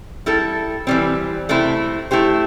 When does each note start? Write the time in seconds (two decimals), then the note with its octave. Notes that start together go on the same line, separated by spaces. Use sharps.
0.26 G3 E4 A4
0.87 E3 G3 C4
1.49 C3 A3 C4 E4
2.11 A3 E4 G4 C5